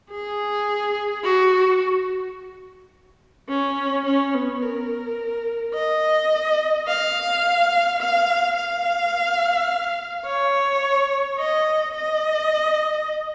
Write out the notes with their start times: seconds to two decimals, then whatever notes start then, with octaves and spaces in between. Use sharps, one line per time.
0.11 G#4
1.23 F#4
3.49 C#4
4.05 C#4
4.34 B3
4.62 A#4
5.75 D#5
6.87 F5
7.99 F5
8.56 F5
10.26 C#5
11.38 D#5
11.94 D#5